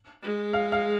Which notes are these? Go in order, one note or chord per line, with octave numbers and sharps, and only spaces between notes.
G#3
F5
F5